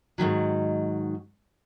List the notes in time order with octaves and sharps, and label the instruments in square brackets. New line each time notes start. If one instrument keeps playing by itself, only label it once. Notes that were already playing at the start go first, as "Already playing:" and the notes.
[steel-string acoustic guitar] G#2 C3 D#3 F#3